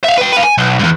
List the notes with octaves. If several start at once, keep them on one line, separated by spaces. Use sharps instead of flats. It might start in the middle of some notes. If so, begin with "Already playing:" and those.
E5 F5
B4 G5
B4 F5
G#5
B1
E2 G2